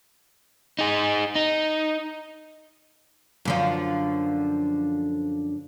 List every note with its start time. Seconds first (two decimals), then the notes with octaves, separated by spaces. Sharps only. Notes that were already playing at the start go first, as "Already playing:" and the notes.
0.79 D#4 G#4
1.35 D#4
3.45 F#2 D3 F3